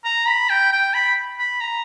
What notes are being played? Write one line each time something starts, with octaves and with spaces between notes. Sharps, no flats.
A#5
B5
G5
G5
B5
B5
A#5